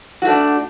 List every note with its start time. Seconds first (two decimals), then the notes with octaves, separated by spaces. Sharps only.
0.22 F#4
0.25 A3
0.28 D4